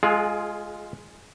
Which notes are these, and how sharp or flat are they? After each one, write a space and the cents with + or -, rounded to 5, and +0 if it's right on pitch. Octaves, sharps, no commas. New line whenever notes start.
G#3 +0 F4 +0 G#4 +35